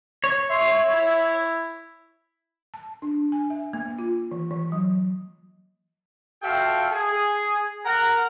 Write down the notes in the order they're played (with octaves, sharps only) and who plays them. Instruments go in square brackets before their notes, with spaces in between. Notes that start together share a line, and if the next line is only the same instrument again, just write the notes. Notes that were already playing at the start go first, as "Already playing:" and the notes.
[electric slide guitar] C#5
[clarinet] E5 [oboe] C6
[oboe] E4
[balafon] A5
D4
G#5
E5
A#3
F4
E3
E3
F#3
[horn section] F4 F#4 A4 E5 F5 G5
G#4
A#4 F#5 A#5